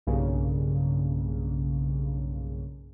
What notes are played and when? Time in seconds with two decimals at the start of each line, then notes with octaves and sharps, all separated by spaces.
0.07 B1 G2 C#3 A#3